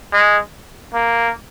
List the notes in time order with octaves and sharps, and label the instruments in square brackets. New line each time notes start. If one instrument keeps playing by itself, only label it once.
[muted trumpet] G#3
A#3